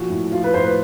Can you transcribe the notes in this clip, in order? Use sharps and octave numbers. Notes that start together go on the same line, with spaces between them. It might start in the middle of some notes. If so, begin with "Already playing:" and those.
Already playing: A#2 F3 F#4
A2
F3 F4
B4
A2 C5
B4